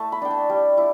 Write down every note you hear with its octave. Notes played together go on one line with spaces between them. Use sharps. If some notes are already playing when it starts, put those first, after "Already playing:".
Already playing: A3 E4 A5
B5
D4 G5
A5
G3
E4